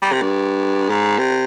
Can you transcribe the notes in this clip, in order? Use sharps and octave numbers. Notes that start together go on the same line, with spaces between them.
G3
C3
G2
G#2
C3